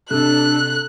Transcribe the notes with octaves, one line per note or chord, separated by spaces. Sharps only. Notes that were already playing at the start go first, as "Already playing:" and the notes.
C3 D4 A4 F#6